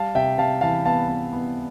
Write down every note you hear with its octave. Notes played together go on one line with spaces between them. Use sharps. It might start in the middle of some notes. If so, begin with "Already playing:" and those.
Already playing: G3 F5 A5
C3 E5 G5
C3 F5 A5
E3 F5 A5
B3 F5 A5
B3
B3